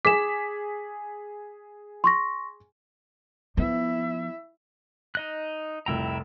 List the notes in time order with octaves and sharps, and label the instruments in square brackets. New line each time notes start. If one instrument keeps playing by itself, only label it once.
[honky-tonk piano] G#4 B6 [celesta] D6 E7
[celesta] C6 C#6 A#6
[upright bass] F3 B3 [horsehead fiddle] E4 E5
[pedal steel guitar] D#4 D#5 F#6
[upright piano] F1 C2 E6 [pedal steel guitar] E4 G5 A#5